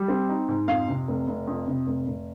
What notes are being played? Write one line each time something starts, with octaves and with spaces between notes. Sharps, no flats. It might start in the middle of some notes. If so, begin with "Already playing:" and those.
Already playing: G3
C4
D#4
G#2
F2 F5
C3
F1
F1
F2
C3
F1
F1